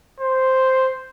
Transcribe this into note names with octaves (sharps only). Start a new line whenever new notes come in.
C5